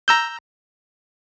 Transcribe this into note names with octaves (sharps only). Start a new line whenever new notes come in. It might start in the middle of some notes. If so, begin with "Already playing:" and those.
A#5 E6 G6